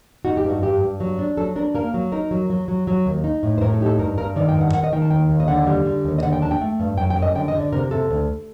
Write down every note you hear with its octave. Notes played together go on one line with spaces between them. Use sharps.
D#4 F#4
G4
G2
F#4
G2 G4
G2
F#3
D4
F#3 A4
D4 A#4
A#3 A#4
F#3
D#4 A#4
F#3
F#3
F#3
F#3
D#2
D#4
A2
C5
A2 A#4
A4
D#4 G4
A4
G2 A#4
G2 A#4
D#3 D5
G5
G2
F#5
D#3 F#5
D#5
D#3 G5
A5
D#2 G5
D#2
D#5
D3 F#5
G3
D3
D#2
D#5
D3 F#5
G5
D4 A5
G5
A3
G2
F#2 G5
G5
F#2
D#5
D3 G5
D#5
D3
D5
C3 A#4
C3 A4
D2